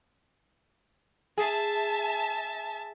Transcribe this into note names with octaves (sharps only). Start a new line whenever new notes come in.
G#4 E5 A5